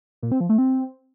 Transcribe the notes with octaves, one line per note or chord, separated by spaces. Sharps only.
A#2
C4
F3
A3
C4